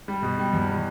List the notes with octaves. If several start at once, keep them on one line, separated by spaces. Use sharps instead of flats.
G3
B2
G3
E2
B2